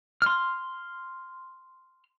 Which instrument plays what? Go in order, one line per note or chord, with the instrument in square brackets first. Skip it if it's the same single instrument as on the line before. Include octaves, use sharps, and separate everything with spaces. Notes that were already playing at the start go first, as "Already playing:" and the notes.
[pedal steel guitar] C6 F6